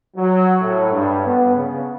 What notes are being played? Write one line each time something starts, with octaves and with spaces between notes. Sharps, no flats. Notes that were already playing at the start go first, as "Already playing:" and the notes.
F#3
A2
G2
B3
C#3